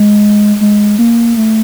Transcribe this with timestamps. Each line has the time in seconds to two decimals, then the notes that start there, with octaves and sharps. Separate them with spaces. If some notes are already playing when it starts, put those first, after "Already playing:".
Already playing: G#3
0.61 G#3
0.99 A#3
1.37 A3